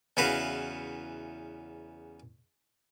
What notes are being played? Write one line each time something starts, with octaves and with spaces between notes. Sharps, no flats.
E2 C#3 E4 F#4 B4 F5